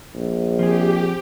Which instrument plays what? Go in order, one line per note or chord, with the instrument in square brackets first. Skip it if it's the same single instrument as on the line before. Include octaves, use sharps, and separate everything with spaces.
[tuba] A#1
[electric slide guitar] F3 C4 G#4 [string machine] G4